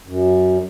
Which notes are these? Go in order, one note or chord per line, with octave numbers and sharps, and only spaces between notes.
F#2